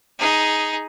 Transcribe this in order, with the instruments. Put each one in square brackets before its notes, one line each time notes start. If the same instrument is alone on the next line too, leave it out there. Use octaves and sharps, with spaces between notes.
[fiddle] D#4 G#4